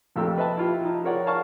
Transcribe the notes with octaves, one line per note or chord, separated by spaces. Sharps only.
A#1 F2 C3 A3 G4 E6
B4 D#5 E5 A5
E4 F4 G4
F3 D#4
F4 G#4 A#4 C#5 D5 F#5
A#4 D5 F5 A5 C#6 F6